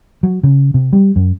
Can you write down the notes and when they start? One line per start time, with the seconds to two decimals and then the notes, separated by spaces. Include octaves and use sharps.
0.23 F#3
0.43 C#3
0.74 C3
0.93 G3
1.16 F#2